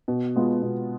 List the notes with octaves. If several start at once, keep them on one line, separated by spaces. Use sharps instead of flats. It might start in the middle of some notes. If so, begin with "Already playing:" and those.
B2
G#3 B3 F4
B2